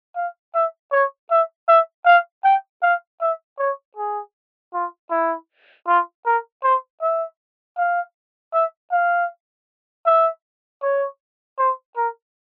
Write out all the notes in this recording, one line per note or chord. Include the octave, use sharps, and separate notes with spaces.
F5
E5
C#5
E5
E5
F5
G5
F5
E5
C#5
G#4
F4
E4
F4
A#4
C5
E5
F5
E5
F5
E5
C#5
C5
A#4